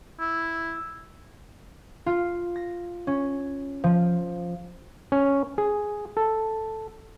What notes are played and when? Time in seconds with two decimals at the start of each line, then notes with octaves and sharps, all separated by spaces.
0.20 E4
2.06 F4
2.56 A#6
3.07 C#4
3.84 F3
5.12 C#4
5.58 G#4
6.17 A4